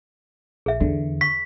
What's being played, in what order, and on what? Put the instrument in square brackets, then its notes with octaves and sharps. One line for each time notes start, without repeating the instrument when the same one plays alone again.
[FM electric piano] A#1 [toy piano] G#4 E5
[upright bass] E2 [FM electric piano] D3
[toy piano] C#6 [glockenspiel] B6